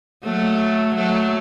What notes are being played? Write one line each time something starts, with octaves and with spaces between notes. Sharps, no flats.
F#3 A3
F#3 A3